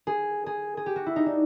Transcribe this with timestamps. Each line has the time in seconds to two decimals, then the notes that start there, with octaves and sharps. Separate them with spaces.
0.07 G#4
0.46 G#4
0.77 G#4
0.86 G4
0.96 F#4
1.06 E4
1.16 D#4
1.26 D4